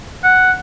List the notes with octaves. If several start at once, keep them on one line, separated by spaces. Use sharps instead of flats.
F#5